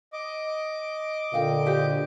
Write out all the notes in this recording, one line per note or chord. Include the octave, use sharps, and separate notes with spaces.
D#5 D6
A#2 D3 F5 G5
F#4 G4 C5